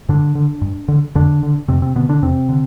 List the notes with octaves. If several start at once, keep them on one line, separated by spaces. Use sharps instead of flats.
G2 D3 D4
D3
G2
D3
F2 D3 D4
D3
F2 C3 C4
C3 C4
B2 D3 B3
D3 D4
E2 C3 C4
D3